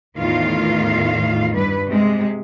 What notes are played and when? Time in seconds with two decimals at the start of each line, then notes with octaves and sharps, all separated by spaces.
0.17 E2 A2 D#3 F4 F5
1.53 G2 B4
1.88 C3 G#3